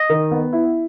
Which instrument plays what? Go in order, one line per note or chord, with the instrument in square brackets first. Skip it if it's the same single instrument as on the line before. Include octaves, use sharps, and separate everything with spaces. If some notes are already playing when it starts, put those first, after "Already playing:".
Already playing: [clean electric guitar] D#5
[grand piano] D#3
B3
E4